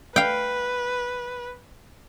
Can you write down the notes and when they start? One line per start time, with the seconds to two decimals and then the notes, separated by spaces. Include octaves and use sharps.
0.16 B4 F5 G5